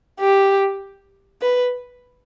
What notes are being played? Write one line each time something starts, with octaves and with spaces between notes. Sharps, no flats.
G4
B4